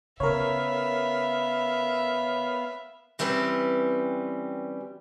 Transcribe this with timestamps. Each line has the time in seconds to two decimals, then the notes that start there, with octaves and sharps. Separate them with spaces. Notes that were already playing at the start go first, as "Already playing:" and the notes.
0.20 C#3 B3 A#4 C#5 E5 F5
3.19 E3 G3 C4 C#4 B4